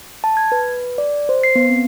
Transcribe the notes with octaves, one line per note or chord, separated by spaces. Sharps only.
A5
G#6
B4
D5
C5
C7
B3
C4